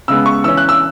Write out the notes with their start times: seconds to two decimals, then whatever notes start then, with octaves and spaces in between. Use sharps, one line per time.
0.08 C#3 G#3 B3 E6
0.26 C#6
0.44 E3 C#4 E6
0.57 F#6
0.69 E6